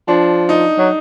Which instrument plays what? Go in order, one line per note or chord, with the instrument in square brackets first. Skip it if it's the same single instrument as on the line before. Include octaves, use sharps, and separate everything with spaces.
[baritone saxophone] F3 [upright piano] D4
[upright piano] D#4
[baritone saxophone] F#3